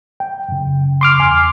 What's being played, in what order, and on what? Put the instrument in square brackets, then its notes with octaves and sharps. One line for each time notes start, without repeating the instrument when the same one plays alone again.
[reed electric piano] G5
F#2 C#3
[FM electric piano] C6 D6 F6
[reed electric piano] E2 G#5